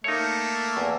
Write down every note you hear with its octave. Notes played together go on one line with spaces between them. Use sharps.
A3 A#3 D#4 C#5
E2